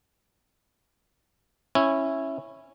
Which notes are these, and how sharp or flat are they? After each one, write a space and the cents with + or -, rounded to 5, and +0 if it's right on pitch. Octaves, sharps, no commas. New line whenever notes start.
C#4 -15 E4 +0